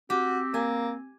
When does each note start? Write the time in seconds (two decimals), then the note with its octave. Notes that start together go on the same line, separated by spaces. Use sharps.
0.10 C4 F#4 G4
0.54 A#3 G#5